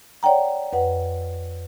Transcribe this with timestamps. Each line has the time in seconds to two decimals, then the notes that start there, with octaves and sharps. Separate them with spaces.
0.23 C#5 D5 F#5 G5 A#5
0.73 F2 B4 F#5